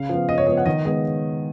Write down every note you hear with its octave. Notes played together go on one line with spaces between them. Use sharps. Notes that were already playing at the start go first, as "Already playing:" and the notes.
Already playing: C#3 F5
F3 B3
C#3 D#5
C#5
F3 B3 D#5
F#5
D#3 D#5
G#3 B3 D#5